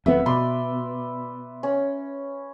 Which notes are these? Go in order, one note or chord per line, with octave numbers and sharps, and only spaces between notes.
D1 F2 B3 E5
B2 B4 D5 C6
C#4